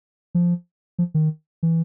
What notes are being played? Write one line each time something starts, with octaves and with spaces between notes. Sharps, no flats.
F3
F3
D#3
E3